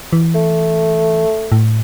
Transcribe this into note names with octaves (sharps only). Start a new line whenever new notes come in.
E3
A3
A2